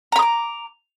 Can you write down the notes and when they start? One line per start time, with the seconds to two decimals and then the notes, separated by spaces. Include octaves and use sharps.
0.12 A#5
0.16 B5
0.19 D#6
0.22 D6